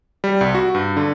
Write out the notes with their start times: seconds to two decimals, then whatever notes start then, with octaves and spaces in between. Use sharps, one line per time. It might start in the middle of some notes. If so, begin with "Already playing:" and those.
0.24 G3
0.41 C2
0.55 F#4
0.75 G2
0.97 D3